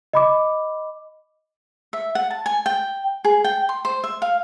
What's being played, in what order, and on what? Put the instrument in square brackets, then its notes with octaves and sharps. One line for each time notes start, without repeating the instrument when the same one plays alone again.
[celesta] D#5 B5 D6
[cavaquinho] E5
F#5
A5
G#5
G5
G#4
G5
C6
C5
E5
F5